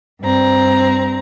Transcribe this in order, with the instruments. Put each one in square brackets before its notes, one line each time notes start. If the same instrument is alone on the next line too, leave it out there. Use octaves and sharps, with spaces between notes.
[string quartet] G2 C4 A#5